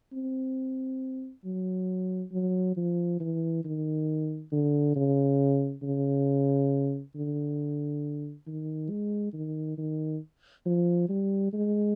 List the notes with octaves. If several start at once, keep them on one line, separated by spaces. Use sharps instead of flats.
C4
F#3
F#3
F3
E3
D#3
D3
C#3
C#3
D3
D#3
G#3
D#3
D#3
F3
G3
G#3